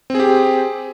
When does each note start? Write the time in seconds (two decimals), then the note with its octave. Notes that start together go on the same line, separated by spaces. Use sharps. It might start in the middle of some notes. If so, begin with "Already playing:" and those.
0.10 C4
0.15 G#4
0.19 G4